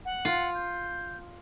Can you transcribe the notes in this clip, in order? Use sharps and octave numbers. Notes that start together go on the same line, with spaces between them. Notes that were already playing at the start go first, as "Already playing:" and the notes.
F#5
F4
G6